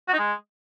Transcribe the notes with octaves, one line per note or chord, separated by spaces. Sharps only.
F#4
D#4
G#3